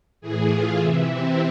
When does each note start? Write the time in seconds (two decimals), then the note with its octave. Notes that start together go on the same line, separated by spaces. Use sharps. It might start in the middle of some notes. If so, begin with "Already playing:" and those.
0.21 A2 E3 G#4
0.50 F4
0.79 C3 E3 E4
1.09 C4